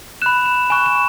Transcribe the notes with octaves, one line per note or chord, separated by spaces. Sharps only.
B5 F#6 E7
E7
G#5 C#6 F#6 E7
E7